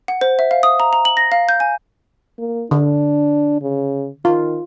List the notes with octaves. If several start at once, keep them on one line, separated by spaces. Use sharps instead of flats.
F#5
C5
E5
F5
D#6
A#5
A#5
F#7
A#6
F5
G6
G#5
A#3
D3 D4
C#3
D#3 F4